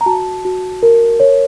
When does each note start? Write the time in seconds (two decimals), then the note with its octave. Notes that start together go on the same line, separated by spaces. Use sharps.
0.01 A#5
0.06 F#4 A5
0.45 F#4
0.83 A#4
1.20 C#5